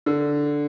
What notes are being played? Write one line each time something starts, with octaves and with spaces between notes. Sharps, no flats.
D3